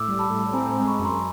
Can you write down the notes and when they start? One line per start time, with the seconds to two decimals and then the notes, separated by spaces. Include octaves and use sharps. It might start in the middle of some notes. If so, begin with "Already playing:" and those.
Already playing: A2 D6 E6
0.08 G3
0.19 A5 B5
0.30 A2
0.53 C4 G#5 A#5
0.70 G#5 A#5
0.76 G#3
0.87 B5 C#6
0.99 F#2
1.05 A#5 C6